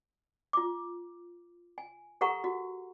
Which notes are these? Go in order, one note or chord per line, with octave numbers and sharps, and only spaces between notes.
F4 D6
G#5
G4 A4 A#4 F#5 A#5 C#6
F#4